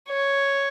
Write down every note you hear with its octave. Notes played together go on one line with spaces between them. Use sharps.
C#5